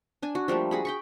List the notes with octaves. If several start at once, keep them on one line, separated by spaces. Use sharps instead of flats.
D4 G#5
F#4
F3 G3 A3 A#3
F#4 G#4 B5
G5 B5 C#6